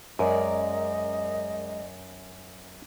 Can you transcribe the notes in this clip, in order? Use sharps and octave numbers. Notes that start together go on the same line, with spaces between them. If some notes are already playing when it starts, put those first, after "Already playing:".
F#2 G#3 A#4 D5 D#5